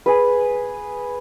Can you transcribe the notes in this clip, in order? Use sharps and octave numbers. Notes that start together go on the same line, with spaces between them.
G#4 B4